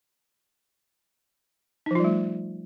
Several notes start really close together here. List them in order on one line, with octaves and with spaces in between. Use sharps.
D#4 F3 F4 G3 A3